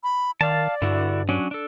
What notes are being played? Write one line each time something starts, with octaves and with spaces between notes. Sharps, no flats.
B5
D#3 D5 F5 A5
G2 D3 E4 F#4
F#3 C#4 D4
D4 A4